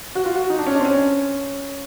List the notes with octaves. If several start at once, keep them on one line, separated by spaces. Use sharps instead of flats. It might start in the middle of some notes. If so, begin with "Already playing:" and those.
F#4
F4
F#4
D#4
D4
C#4
D4
C4
C#4